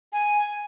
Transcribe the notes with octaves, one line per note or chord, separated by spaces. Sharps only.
G#5